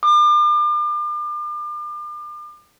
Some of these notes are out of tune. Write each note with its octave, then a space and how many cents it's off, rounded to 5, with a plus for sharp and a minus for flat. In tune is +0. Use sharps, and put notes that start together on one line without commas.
D6 +40